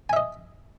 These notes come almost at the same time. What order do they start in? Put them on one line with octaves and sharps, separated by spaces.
G#5 E5 D#5